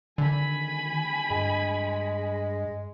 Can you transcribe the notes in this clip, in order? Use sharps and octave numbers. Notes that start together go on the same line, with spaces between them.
D3 D#3 G#5 B5
G2 G#3